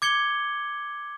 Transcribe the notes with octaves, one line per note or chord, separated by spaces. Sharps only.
D6 G#6 C#7 G7